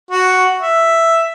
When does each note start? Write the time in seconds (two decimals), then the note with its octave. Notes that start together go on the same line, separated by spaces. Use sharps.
0.11 F#4
0.61 E5